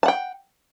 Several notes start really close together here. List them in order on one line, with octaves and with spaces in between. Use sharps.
A5 F#5 G5